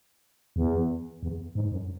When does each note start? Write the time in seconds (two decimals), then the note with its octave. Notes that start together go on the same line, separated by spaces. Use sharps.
0.56 E2
1.23 E2
1.55 G#2
1.72 F#2